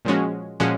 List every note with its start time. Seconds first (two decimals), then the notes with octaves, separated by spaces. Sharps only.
0.05 A#2 F3 G#3 C#4 F#4
0.60 A#2 F3 G#3 C#4 F#4